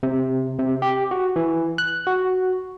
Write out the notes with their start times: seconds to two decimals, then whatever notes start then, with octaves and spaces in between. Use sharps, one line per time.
0.03 C3
0.59 C3
0.82 G4
1.11 F#4
1.36 E3
1.78 F#6
2.07 F#4